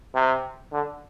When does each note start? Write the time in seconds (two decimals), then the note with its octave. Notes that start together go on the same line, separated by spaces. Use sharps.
0.15 C3
0.72 D3